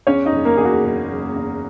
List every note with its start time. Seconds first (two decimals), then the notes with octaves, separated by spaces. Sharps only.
0.07 E2 C#4 C#5
0.25 D#4 D#5
0.32 F#1
0.45 A#3 A#4
0.57 E2 G#4
0.65 F#4
0.83 F#1
1.09 F#1
1.36 E2